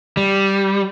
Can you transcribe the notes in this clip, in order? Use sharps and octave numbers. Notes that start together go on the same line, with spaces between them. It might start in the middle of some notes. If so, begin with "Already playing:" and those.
G3